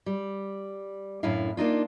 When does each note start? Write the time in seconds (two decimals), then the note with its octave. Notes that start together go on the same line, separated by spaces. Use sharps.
0.06 G3
1.23 F#2 A2 D4 E4 F5
1.57 A#3 D4 D#4 F4